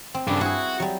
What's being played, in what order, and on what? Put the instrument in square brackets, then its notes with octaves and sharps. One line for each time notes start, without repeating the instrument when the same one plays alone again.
[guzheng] C4
[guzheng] G2 [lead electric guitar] C#3 D4
[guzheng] E4 G#4 [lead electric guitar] F#4
[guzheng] F#3 G3